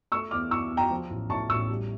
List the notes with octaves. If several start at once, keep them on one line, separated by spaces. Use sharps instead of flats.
A3 C#6 E6
E2 D6 F6
E3 C#6 E6
E2
G5 A#5
F3
A1
A2 A5 C#6
A1 C#6 E6
G3